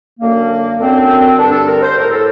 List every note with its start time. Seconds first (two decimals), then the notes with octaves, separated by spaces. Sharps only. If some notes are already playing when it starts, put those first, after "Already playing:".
0.20 F#2 D3 A#3
0.79 F#2 D3 C4
1.38 G2 D3 D4
1.52 A4
1.67 A#4
1.82 C5
1.96 A2 A#4
2.11 A4